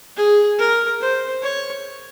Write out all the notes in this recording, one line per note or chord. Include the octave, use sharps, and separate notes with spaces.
G#4
A#4
C5
C#5